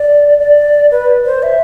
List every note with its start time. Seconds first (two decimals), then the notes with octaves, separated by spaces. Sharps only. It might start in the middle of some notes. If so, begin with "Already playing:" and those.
Already playing: D5
0.40 D5
0.91 B4
1.25 C5
1.43 E5